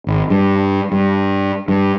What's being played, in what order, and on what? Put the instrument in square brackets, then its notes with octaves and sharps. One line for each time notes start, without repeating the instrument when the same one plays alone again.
[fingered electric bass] G#1
G2
G2
G2